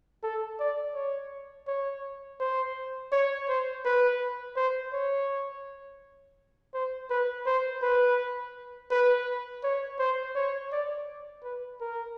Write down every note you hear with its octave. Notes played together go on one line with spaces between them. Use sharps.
A4
D5
C#5
C#5
C5
C#5
C5
B4
C5
C#5
C5
B4
C5
B4
B4
C#5
C5
C#5
D5
B4
A#4